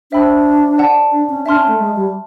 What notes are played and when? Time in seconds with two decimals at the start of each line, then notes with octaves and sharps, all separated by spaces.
0.12 D4 C5 E5 G5 B5 E6
0.78 D5 F#5 A5
1.12 D4
1.29 C#4
1.46 D4 E5 A5 C6 F6
1.56 C#4
1.68 A3
1.79 G#3
1.95 G3